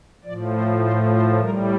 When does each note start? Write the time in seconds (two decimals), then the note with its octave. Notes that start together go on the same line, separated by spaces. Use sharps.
0.25 A2 F3 D5
0.54 C5
0.83 C5
1.12 C5
1.41 A2 G3 A#4